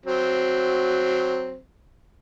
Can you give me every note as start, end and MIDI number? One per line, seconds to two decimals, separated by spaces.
0.06 1.58 54
0.06 1.58 60